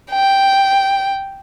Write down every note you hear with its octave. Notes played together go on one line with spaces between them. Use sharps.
G5